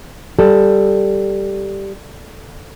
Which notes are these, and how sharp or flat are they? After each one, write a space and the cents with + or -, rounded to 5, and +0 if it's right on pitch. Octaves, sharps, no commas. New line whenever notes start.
G3 +0 A4 +0